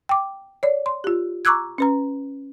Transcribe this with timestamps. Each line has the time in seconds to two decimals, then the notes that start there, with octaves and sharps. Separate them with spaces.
0.09 G5 D6
0.63 C#5 D5
0.86 C6
1.04 F4 G4
1.45 A#5 C#6 D6 E6 F#6 G#6
1.78 C#4 B4 A#5